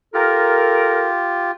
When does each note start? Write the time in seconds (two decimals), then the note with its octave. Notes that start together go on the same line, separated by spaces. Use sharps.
0.14 F4 G4 A4 A#4